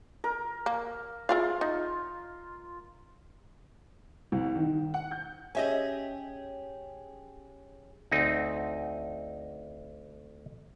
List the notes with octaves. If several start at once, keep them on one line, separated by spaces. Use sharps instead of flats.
A#4
A#3
E4 F4 G#4 F5
D#4
C2
D#3
F#5
G6
C#4 G4 G#4 D#5 E5 G#5
D2 C4 D#4